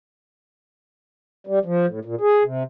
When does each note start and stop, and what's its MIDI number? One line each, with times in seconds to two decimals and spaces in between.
1.47 1.59 55
1.65 1.86 53
1.87 2.00 45
2.05 2.15 46
2.21 2.43 68
2.44 2.63 48